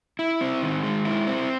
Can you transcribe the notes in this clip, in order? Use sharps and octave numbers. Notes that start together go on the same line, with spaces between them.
E4
C4
D#3
G#3
E4
C4